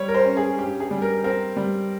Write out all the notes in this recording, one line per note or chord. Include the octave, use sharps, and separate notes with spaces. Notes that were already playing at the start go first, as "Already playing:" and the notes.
Already playing: G3 C#5
A#4
C5
C#4
G#4
G2 G4
G#4
G3
A#4
C4 A#4
G3